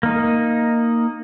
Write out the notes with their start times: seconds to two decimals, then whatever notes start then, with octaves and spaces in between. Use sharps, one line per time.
0.03 A#3 D#4